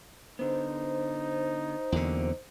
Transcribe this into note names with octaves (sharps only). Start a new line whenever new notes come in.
D3 B3 D#4 C5
E2 D3 F#3 A#3 C4